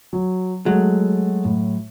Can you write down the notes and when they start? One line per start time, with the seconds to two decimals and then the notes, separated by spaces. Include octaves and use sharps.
0.13 F#3
0.66 F#3 G#3 A3
1.45 A2